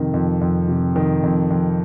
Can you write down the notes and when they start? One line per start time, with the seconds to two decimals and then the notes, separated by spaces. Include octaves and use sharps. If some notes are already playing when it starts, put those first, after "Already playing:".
Already playing: F2 C3 D#3
0.14 F2
0.41 F2
0.68 C3
0.96 D#3
1.23 F2
1.50 F2